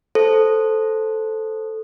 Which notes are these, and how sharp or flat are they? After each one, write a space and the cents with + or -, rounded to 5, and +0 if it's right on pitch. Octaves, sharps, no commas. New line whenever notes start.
A4 -5 C5 +0